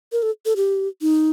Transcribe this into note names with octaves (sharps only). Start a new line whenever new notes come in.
A#4
A4
A4
G4
D#4